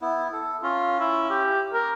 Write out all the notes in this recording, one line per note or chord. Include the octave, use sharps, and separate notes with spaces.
B3 E4
A4
C#4 F4
E4
G4
A#4